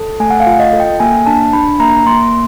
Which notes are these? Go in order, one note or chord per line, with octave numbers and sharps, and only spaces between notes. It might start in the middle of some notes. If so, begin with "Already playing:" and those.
Already playing: A4
A3 G#5
F#5
F5
F4
D#5
A4
G5
A#3 G#5
D4 A5
D4 B5
A#3 A#5
A#3 C6